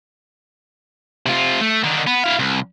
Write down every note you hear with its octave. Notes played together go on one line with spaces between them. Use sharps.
C3 F4
A3
D3 D#3
B3
E4 F5
C2